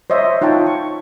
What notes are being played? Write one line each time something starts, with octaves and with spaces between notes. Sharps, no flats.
C5 C#5 D#5 E5
D#4 F4 C#5 G5 A5
C#6